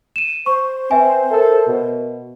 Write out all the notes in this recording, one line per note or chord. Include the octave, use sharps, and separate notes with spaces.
D#7 E7
C5 C#6
C4 B4 E5 G#5
A4 A#4 E5
B2